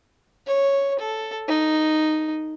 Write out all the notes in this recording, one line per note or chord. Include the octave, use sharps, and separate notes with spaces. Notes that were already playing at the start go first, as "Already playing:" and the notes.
C#5
A4
D#4